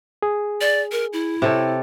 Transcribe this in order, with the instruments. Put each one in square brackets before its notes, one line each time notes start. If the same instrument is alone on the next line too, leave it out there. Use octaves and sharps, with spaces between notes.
[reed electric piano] G#4
[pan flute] D5
A#4
E4
[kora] C3 A4 C#5